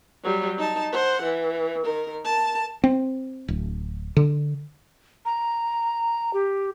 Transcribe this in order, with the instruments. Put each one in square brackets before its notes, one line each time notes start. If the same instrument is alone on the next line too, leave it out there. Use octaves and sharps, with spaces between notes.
[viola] F#3 G3
D#4 A5
C5 F#5
E3
D#3 A#4
A#4 A5
[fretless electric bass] C4
D1
D3
[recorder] A#5
G4